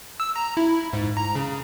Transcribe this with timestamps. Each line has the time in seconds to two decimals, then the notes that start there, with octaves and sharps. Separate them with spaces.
0.20 E6
0.36 A#5
0.57 E4
0.93 G#2
1.17 A#5
1.35 C#3